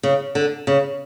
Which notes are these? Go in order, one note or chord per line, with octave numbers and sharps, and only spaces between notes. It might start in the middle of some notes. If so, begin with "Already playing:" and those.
C#3
D3
C#3